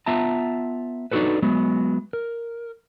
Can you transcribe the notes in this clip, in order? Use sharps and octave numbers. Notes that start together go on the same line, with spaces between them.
B3 F4 E5 A5 A#5
D4 D#4 F4 F#4 A4 B4
F#3 G#3 B3
A#4